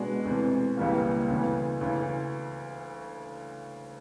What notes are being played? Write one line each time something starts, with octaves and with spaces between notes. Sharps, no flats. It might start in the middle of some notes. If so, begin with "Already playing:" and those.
Already playing: B2 G#3 B3 D4 F#4
D2 C3 E3
C#2 C#3 E3 G3 A#3
D2 C#3 E3
D2 C#3 E3